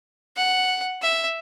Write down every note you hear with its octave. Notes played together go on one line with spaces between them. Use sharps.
F#5
E5